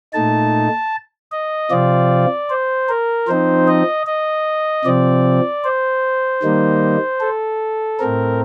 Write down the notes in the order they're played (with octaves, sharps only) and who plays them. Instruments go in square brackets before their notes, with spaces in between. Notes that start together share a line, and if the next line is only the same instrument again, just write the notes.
[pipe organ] A#2 A3 D#4 A5
D#5
C3 F3 C4 F4 D5
C5
A#4
F3 C4 D#4 C5
D#5
D#5
C3 F3 C4 D5
C5
D#3 G3 A#3 D#4
A4
A2 A3 C4 A#4